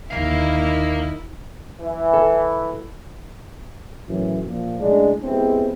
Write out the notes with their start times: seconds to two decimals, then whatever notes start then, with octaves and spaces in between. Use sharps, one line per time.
0.11 D#2 D3 D#3 E4 A#4 F5
1.80 E3
2.13 A4
4.07 F#2 A2 E3
4.45 A#2 F3
4.79 A2 C#3 G#3 A3 D4
5.23 G#3 B3 C4 E4 G4 G#4